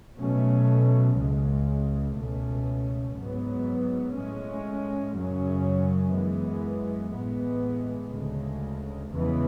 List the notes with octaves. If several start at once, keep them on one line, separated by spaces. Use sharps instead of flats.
B2 F#3 A3 C#4
C#2 C#3 G#3
C#2 B2 A3 C#4
G#2 F#3 B3
A2 G#3 C#4
F#2 C#3 F#3 C#4
F#2 E3 G#3 B3
A2 E3 G#3 B3
D2 C#3 G#3
E2 C#3 E3 G#3 B3